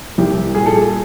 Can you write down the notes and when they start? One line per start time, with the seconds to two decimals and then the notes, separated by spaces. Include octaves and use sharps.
0.18 C2 G4
0.54 A#2 G3 G#4
0.66 A4
0.76 G#4